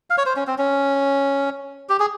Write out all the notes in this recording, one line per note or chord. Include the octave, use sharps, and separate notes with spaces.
F5
C#5
C5
C#4
C4
C#4
G4
G#4